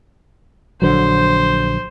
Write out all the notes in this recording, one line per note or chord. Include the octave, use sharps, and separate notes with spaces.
A#1 D3 F#3 C5